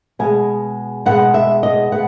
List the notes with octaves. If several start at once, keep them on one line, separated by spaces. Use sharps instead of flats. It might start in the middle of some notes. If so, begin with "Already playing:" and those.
B2 G#3 B3 G#5
B2 G#3 B3 F#5
E5
D#5
B2 G#3 B3 F#5